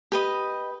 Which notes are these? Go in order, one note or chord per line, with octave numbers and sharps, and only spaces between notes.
G4 B4 D#5